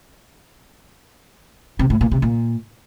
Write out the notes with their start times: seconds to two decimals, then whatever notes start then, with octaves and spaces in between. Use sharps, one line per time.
1.79 C3
1.90 A2
2.01 A#2
2.11 C3
2.22 A#2